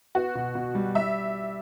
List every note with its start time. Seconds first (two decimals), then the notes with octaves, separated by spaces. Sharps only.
0.15 B3 F#4
0.35 B2
0.55 B2
0.75 G3
0.95 G3 E5